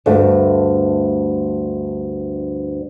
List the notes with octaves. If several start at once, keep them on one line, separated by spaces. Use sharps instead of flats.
D2 G2 A3